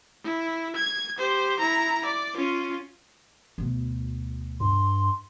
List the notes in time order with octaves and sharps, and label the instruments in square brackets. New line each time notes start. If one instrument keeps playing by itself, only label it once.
[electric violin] E4
G#6
G4 C5
E4 A#5
D5
C#4 F4
[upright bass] D2 B2
[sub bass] G2 [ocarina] C6